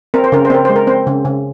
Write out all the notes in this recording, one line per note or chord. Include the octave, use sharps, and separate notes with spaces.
C4 A#4
C5
C#3 A#4
C5
C4 A#4
G#3 C5
A#4
C4 C5
C#3
C#3